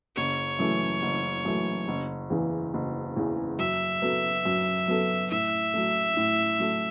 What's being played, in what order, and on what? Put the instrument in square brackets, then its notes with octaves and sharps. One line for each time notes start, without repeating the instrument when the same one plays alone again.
[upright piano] F#1 [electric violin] C#5
[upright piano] F#2 E3 A3
F#1
F#2 E3 A3
F#1
E2 C#3 E3
F#1
E2 C#3 E3
[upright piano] F#2 [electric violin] E5
[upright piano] F#3 B3 A4
F#2
F#3 B3 A4
[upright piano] A2 [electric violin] E5
[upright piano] F#3 A3
A2
F#3 A3